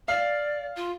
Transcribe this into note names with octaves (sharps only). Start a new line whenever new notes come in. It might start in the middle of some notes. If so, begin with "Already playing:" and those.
D5 F5
F4